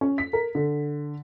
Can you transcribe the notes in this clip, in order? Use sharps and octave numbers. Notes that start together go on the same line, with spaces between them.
C#4
B6
A#4
D3